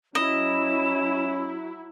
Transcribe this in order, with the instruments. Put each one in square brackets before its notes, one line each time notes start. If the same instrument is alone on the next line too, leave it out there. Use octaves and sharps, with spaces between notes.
[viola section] F#3 E4 [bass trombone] C#4 [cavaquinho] D#5 [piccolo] E7